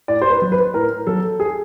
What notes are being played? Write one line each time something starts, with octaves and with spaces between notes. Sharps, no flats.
A2 D5
C5
B4
F#3
B4
A2 A#4
F#3 A4
G#4